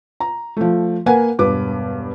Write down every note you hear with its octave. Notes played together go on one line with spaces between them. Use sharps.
A#5
F3 A3
A#3 A#4 B4 F5 F#5 G#5
E1 G2 B4 D6